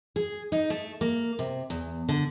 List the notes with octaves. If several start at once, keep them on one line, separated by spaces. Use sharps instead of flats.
G#4
D#4
A3
A#3
C3
E2
D3